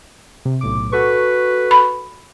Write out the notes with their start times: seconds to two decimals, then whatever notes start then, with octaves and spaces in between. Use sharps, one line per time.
0.45 C3
0.61 B1 A2 D6
0.92 F#4 A4 B4 C#6
1.71 B5